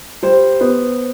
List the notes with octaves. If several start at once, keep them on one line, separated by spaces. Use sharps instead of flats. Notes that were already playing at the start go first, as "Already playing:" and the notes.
G3 C5
B3